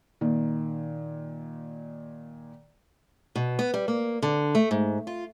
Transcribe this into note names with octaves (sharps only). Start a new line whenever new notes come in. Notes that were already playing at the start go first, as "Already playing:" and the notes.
A#2 D#3
B2
B3
G3
A#3
D3
A3
G#2
F4